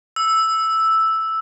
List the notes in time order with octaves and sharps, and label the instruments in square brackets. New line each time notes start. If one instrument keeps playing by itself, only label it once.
[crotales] E6